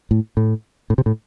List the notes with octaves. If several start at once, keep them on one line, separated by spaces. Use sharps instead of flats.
A2
A2
A2
C3
A2